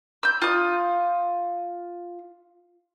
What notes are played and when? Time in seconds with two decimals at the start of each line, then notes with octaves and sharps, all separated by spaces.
0.23 E6 G6
0.42 F4 D#6